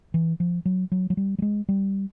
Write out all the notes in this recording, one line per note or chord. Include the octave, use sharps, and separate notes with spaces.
E3
F3
F#3
F#3
F#3
G3
G3
G#3
G3